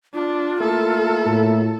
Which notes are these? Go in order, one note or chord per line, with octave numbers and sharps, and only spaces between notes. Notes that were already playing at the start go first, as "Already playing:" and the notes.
D4 F4
A3 A#3 E4 A4
A2